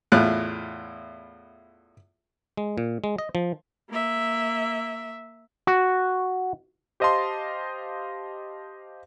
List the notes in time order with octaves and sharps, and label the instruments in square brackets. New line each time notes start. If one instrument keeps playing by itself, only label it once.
[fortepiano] E2 A2 F4 F#6
[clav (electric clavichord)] G#3
A#2
G#3
D#5
F3
[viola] A#3 E5
[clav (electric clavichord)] F#4
[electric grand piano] G4 C5 D#5 F5 A5 C6